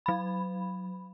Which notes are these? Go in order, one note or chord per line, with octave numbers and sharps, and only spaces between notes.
F#3 B5